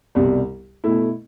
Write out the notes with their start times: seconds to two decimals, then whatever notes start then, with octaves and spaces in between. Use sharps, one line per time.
0.15 C2 B2 G3
0.84 B2 A3 E4